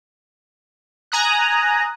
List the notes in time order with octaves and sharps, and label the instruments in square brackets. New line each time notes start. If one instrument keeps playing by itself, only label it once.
[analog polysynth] G#5 A#5 D#6 F#6